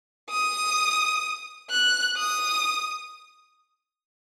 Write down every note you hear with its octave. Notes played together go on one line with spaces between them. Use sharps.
D#6
F#6
D#6